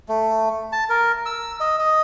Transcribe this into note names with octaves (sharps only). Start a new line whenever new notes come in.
A3
A5
A#4
E6
D#5
D#5